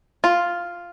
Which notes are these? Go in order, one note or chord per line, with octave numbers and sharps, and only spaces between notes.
F4